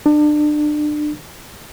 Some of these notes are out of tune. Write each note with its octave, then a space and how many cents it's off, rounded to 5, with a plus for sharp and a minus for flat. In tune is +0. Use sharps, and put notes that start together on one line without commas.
D4 +30